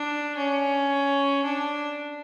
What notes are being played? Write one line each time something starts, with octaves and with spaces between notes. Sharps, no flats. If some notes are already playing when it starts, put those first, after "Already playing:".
Already playing: D4
C#4
D4